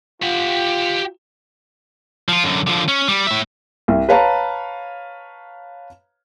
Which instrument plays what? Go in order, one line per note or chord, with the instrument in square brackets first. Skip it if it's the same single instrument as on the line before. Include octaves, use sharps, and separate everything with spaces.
[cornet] F4 [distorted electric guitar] G4 F#5
[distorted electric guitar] F3 F4
F#2 D3
D3 F3
C#4
G3
A2 E5
[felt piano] C2
B4 C#5 F5 A5 A#5